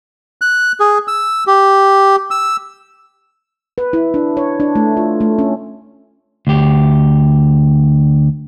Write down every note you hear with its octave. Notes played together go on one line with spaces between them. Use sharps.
F#6
G#4
E6
G4
E6
B4
E4
D4
C#5
D4
A3
F4
A3
C#4
D2 G4